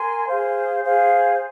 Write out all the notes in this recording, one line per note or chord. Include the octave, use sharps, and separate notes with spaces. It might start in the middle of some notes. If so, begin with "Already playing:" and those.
Already playing: A#4 G#5 C6
G#4 C5 F5
G#4 C5 F5